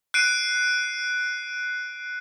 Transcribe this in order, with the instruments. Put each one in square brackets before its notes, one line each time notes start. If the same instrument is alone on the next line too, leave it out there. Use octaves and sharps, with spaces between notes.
[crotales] F#6 C7 D7 D#7